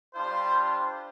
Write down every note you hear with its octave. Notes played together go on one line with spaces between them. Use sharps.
G3 D4 F4 C5